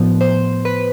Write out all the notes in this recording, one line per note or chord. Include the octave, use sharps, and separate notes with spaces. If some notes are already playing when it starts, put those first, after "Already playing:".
Already playing: A2 F3 B3
C5
B4